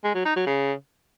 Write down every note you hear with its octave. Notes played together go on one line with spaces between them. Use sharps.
G#3
F#3
D#4
F#3
C#3